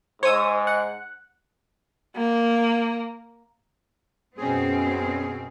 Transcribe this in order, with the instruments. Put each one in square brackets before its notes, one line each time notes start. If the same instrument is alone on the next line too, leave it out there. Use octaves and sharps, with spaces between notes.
[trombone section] G#2 [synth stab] C5 E6 [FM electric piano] C#5 D#6
[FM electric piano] F#5
[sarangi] A#3
[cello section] F#2 B2 C4 [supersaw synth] C#4 G#4